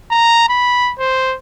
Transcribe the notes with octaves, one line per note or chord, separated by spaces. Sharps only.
A#5
B5
C5